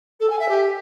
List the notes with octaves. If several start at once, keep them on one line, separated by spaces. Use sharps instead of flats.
A4
G#5
E5
G4